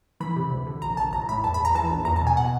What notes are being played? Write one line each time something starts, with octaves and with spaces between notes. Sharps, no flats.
E3 B5
C3
D2
D3
A#1 A#5
A#1 A5
A1 A#5
A2 B5
E2 A5
B5
E2
A#5
E3 A5
A#1
E2 A#5
A5
B2 G#5
B2 F#5